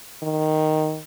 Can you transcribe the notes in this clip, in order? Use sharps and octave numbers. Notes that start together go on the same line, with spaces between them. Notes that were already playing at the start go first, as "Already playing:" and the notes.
D#3